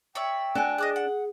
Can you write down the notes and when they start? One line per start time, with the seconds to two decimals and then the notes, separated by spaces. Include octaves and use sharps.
0.15 C#5 D5 E5 G5
0.55 D4 F#4 A4 G#5
0.78 G#4 D#5 D6 F#6
0.96 F#5